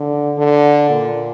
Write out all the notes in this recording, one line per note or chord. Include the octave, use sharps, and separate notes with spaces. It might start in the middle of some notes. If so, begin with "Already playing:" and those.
Already playing: D3
D3
A#2